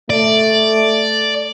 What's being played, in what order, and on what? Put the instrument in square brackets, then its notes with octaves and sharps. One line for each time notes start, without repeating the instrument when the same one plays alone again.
[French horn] A3 [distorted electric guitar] D5